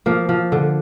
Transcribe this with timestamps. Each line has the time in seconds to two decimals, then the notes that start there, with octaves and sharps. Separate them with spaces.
0.06 F3 A#3
0.29 F3
0.52 D3